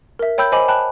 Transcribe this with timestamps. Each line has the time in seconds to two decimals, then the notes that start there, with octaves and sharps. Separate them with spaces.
0.19 A#4 E5
0.38 C#5 G5 B5 E6 G6
0.52 C5 D#5 G#5 B5 D6
0.68 G5 A5 B5 F#6